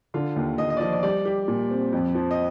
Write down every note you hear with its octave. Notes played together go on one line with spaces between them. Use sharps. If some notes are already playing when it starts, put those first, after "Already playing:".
D3 F4
D#2
D#2 D#5
D#5
D5
F3 D#5
D5
G3 D5
G4
A#2
C4
F2
F3
D#5